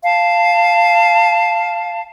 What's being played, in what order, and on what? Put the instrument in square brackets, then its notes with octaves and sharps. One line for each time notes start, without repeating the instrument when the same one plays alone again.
[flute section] F5 A5